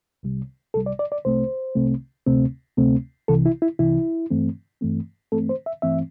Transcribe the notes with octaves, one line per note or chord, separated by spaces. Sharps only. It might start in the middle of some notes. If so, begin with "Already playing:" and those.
C2 C3 G3
C2 C3 G3 A4
D5
D5
D5
C2 C3 A3 C4 C5
C2 C3 A3 C4
D2 C3 A3 C4
D2 C3 A3 C4
C2 C3 E3 A4
E4
E4
C2 C3 E3 E4
G2 E3 A3 C4
G2 E3 A3 C4
G2 E3 A3 C4 A4
C5
E5
G2 E3 A3 C4 E5